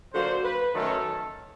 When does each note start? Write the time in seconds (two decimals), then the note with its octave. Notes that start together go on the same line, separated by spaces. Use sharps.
0.14 D3 F#3 A#3 C5
0.44 B4
0.75 F#2 D#3 F#3 A3 C#4 A4